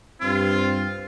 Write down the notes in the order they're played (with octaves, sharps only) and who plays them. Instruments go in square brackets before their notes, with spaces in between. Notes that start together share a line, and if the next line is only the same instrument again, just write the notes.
[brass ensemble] G2 C4 [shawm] F4